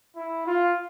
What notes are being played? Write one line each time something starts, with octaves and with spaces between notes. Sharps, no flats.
E4
F4